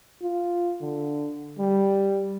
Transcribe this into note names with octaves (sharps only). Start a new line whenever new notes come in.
F4
D3
G3